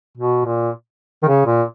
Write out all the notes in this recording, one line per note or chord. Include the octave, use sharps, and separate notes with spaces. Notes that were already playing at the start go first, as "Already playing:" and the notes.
B2
A#2
D#3
C#3
A#2